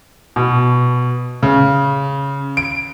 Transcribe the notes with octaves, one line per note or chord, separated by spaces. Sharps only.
B2
C#3
D7